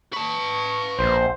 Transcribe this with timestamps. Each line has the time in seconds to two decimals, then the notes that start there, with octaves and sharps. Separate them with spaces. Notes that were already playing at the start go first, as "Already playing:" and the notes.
0.13 B4 A5 C#6
0.99 A#1 C5